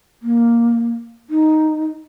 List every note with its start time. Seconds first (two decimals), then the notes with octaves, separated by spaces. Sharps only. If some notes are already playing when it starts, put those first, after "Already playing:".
0.22 A#3
1.30 D#4